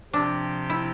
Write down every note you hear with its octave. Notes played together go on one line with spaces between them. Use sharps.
C3 F3 C4 D4 G4
E4